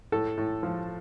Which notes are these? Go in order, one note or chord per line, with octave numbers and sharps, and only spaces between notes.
A2 A4
A2
F3